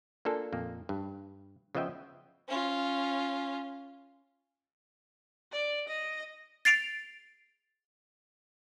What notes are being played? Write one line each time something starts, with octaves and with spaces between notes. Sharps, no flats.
A#3 D4 F4 A4 G#5
F2 A#2 A#3
G2
C#3 F3 B3 D#5 E5 G5
C#4 F4
D5
D#5
A6 C7 D7 F7